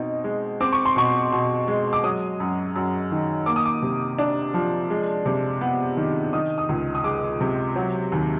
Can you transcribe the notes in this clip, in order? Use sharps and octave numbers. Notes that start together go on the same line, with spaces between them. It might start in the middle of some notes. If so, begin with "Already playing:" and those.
Already playing: B2 C4 D#4
G#3
C4 D6
C#6
C6
B2 C#6
B2
G#3
D6
F#3 D#6
F#2
F#2
D#3
A#3 D6
D#6
D6
C3
D4
F3
G#3
C3
B3
D#3
D#3 D#6
D#6
C#2
D#6
G#3 D6
C3
F#3
D#2